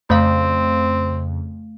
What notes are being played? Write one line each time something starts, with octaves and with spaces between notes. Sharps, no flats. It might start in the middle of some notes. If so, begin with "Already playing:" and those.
F2 C#3 A3 C4 F5